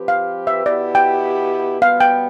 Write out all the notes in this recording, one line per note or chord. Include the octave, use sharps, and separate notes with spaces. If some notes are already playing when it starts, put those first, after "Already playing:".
Already playing: F3 C4 G4 B4
F5
E5
B2 B3 E4 G4 D5
G5
B2 G3 B3 F5
G5